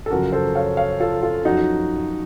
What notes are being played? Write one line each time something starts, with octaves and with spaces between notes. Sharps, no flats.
A4
F#2 C#3 F3 F#4 A#4
A4 C5
C#5 F5
C#5 F5
F4 A4
F4 A4
F#2 F3 D#4 F#4